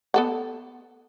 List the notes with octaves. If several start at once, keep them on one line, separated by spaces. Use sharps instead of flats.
B3 A4 F#5